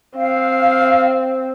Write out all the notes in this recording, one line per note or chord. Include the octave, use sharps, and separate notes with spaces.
C4 F5